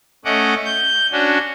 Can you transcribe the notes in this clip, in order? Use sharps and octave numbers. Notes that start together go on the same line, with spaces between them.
A3 C#4 D#5 F#5 D6
G6
C#4 D4 F#4